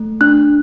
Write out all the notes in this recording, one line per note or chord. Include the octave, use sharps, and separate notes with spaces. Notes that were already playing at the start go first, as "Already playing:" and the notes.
Already playing: A3
D4 F#6